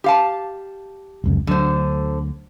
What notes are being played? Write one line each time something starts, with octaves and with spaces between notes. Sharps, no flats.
G4 F5 A5
F1 C#2 F#2
D2 D3 F#3 C5